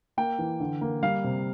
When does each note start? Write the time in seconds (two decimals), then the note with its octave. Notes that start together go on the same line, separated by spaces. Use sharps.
0.17 A#3 G5
0.39 E3
0.60 D3
0.81 A#3
1.03 G3 F5
1.24 C3